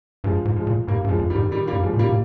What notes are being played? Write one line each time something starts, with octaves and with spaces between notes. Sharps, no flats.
G2 F3 G#3
G#2
F3 G#3
A#2
G#2 G3 A#3
G2
F3 G#3
F2
D#3 G3
G#2
D#3 G3
G3 A#3
G2
F3 G#3
A#2
G3 A#3
A#2